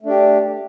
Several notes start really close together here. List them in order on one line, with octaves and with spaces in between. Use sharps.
A3 D4 G4